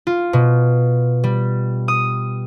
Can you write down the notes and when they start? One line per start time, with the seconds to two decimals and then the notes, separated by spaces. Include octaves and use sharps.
0.07 F4
0.33 B2
1.24 G3
1.88 D#6